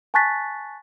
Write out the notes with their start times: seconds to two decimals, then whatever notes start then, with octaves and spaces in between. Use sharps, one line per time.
0.14 G#5 A5 C#6 F#6 A6 B6